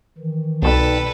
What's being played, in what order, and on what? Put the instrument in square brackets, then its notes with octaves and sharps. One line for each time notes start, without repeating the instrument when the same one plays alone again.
[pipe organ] D#3 E3
[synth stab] C2 B2 [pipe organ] D#4 D5 G5 [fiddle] A4 B4